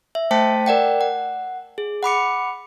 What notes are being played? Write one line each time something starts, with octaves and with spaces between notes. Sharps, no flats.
E5
A3 C5 G5 A5 B6
A#4 D5 F#5 G5
F#5
G#4
F#5 B5 D6 C#7